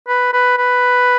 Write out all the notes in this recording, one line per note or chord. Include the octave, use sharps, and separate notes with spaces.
B4
B4
B4